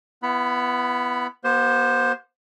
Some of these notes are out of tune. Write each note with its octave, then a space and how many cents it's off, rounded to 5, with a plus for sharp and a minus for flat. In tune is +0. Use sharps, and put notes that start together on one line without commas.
B3 +0 E4 +30 B5 +0
B3 -45 G4 -15 C5 +0